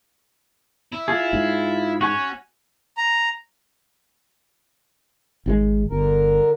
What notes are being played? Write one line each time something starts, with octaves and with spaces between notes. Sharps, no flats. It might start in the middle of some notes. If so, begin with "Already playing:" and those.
E4
F4 G#4
G#2
C#4 F#4 F#5 G#5
A#5
G#1 B2 G#3
G1 D3 A#4